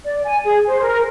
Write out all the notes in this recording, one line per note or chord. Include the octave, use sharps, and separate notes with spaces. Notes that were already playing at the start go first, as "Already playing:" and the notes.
D5
G#5
G#4
C5
A#4